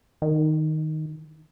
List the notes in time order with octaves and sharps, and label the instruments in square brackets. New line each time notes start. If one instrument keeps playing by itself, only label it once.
[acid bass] D#3